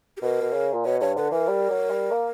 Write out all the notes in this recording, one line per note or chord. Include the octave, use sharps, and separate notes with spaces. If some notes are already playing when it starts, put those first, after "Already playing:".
G4
B2 A#4
B2
C#3
A#2
B2 C#5
G2 C#5
D3 B4
E3 A#4
G3
F#3
G3
A#3